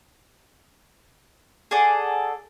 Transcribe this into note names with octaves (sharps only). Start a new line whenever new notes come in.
G#4 A4 D5 F#5